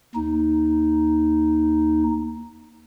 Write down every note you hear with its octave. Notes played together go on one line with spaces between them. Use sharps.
D#2 D#4